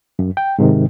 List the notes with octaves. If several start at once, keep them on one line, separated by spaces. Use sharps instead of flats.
F#2
G5
G#2 C3 D#3